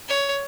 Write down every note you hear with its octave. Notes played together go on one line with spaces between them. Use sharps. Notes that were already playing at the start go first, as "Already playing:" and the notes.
C#5